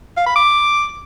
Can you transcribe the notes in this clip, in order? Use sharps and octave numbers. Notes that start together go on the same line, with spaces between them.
F5
B5
D6